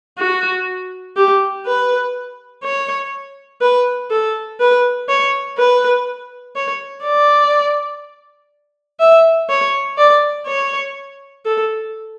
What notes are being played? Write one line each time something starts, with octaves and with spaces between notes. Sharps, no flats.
F#4
G4
B4
C#5
B4
A4
B4
C#5
B4
C#5
D5
E5
C#5
D5
C#5
A4